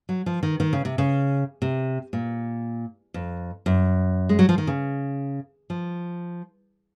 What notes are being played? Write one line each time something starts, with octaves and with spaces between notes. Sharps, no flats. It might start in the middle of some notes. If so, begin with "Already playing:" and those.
F#3
F3
D#3
D#3
C#3
C3
C#3
C3
A#2
F2
F#2
G#3
F#3
F3
D#3
C#3
F3